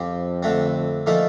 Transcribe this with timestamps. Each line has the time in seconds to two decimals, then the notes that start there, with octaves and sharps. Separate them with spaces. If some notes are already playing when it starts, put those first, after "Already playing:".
Already playing: F2 F3 C4 G4
0.43 D3 A3 C4
1.06 A#2 F3 A3 D#4 A4